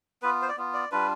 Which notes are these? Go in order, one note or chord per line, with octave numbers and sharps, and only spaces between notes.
B3 F4 B4
C5
D5
B3 F4
D5
G3 D4 F4 B4